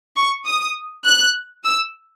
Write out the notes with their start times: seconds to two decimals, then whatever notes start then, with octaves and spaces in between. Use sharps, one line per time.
0.16 C#6
0.46 D#6
1.05 F#6
1.64 E6